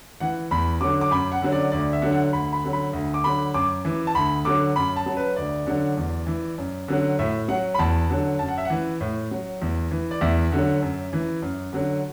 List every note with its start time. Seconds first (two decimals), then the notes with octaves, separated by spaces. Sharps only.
0.20 E3 F#5
0.51 E2 B5
0.81 D3 F#3 D6
1.01 D6
1.11 F#2 B5
1.32 F#5
1.42 D3 F#3
1.52 D5
1.72 D2 D5
1.93 E5
2.02 D3 F#3
2.12 F#5
2.33 D2 B5
2.53 B5
2.64 D3 F#3
2.73 B5
2.93 D2
3.14 D6
3.24 D3 F#3 B5
3.54 F#2 D6
3.85 E3
4.07 A5
4.14 D2 B5
4.45 D3 F#3 D6
4.76 F#2 B5
4.96 A5
5.06 F#3
5.17 B4
5.36 D2 D5
5.67 D3 F#3
5.97 E2
6.27 E3
6.58 F#2
6.88 D3 F#3
7.19 A2 E5
7.48 F#3 F#5
7.74 B5
7.79 E2 A5
8.09 D3 F#3
8.39 F#2 A5
8.49 F#5
8.58 E5
8.65 E3 F#5
9.01 A2
9.31 F#3
9.62 E2
9.91 E3
10.11 D5
10.21 E2 E5
10.52 D3 F#3
10.82 F#2
11.13 E3
11.42 F#2
11.73 D3 F#3